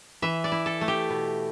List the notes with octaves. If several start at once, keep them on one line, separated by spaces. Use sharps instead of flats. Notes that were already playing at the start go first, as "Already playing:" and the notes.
E3 E5
D5
E4
A4
A3
G4
B2